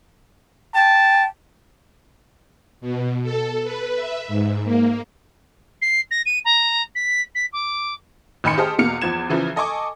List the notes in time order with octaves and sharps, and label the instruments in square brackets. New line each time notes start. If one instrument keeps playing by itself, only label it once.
[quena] G5 [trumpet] A5
[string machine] B2
A4
B4
E5
G#2
A#3
[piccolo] C7
A#6
D#7
A#5
B6
B6
D6
[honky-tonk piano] A1 D#3 G#5 B5 C6 C#7
G4 G#4 C5 D#5 A5 F6
E2 B2 A#3 F6 C#7 F7
E2 F3 G#6 E7
C#3 E3 F3 C#4
A4 D#5 G#5 C#6 D6